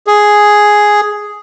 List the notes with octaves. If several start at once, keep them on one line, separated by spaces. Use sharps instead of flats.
G#4